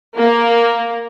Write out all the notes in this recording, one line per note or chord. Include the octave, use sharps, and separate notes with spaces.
A#3